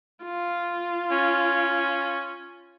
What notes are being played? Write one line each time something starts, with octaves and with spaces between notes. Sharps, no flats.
F4
C#4